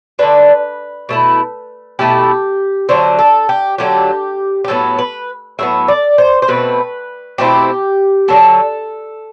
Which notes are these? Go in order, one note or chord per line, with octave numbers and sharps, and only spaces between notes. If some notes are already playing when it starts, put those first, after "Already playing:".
D3 A3 D4 B4
B2 A3 E4
B2 A3 E4 G4
D3 F#3 A3 C5
A4
G4
D3 F#3 A3 G4
G4
A2 F#3 B3 A4
B4
A2 F#3 B3 E5
D5
C5
C5
B2 A3 C4 B4
B2 A3 C4 E4 G4
D3 F#3 B3 A4